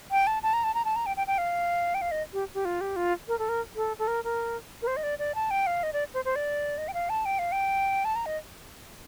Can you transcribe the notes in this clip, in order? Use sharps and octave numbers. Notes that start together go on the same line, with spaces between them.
G5
A5
A5
A#5
A5
A#5
A5
A#5
G5
G5
G5
F5
G5
F5
D#5
G4
G4
F4
G4
F4
A#4
A4
A#4
A4
A4
A#4
A#4
A#4
C5
D#5
D5
D5
A5
G5
F5
D#5
D5
C5
C5
D5
D#5
G5
F5
A5
G5
F5
G5
A5
A#5
D#5